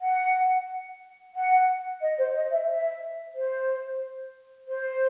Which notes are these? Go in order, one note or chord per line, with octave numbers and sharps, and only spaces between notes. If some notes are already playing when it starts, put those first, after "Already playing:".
F#5
F#5
D#5
C5
D#5
E5
E5
C5
C5